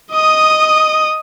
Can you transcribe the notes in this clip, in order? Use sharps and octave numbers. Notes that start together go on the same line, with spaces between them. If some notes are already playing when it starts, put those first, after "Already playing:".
D#5 D#6